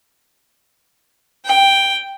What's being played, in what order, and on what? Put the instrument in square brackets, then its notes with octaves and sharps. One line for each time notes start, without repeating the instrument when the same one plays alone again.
[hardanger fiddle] G5